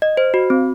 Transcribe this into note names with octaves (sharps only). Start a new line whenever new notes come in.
D#5
C5
F#4
C4